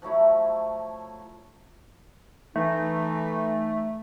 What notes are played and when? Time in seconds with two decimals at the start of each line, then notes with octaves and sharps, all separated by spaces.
0.02 F3 F#3 A3 E4
2.56 E3 A3 D#4